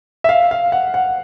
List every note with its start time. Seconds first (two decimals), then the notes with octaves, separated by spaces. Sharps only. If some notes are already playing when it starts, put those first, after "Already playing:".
0.24 E5
0.29 F5
0.51 F5
0.72 F#5
0.94 F#5